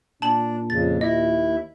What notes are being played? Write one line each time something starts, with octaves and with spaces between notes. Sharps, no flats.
A#2 D4 A5 F#7
F2 C#3 A6
D#2 E4 D#5 E5